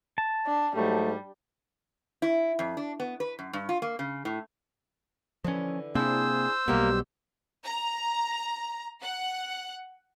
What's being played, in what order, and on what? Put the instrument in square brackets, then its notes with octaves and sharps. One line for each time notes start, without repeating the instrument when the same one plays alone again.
[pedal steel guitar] A5
[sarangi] D4
[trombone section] G#2 F#3 A3 [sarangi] G3
[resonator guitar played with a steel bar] E4
F2
D4
B3
B4
F#2
G2
F4
A#3
C#3
A2
[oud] D3 E3 [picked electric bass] F3 C#4
[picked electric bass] C3 A#3 C4 [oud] D4 E4 [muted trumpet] G#4 [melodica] C5 E6
[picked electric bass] B1 B2 [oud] G3 B3 G4 [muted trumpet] A#3
[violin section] A#5
F#5